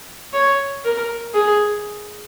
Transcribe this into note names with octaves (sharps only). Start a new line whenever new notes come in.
C#5
A#4
G#4